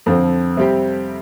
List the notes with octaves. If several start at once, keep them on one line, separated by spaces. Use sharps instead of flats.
F2 D3 F3 C4
C3 G3 C4 G4